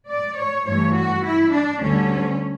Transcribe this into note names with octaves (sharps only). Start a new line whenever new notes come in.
D5
C#5
G2 E3 A3 C#5
F#4
E4
D4
D2 D3 G3 C#4